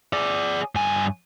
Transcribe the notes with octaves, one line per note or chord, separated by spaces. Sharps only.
G#4 D5
G2 G#5